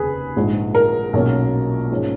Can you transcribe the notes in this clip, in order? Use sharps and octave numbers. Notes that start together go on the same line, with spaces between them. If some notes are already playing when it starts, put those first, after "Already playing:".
Already playing: F1 D#2 C#3 G#4 B4
A#1 G#2 F3 G#3
A#4
B1 A#2 F#3 A#3 C#4
G#2 F3 G#3 C#4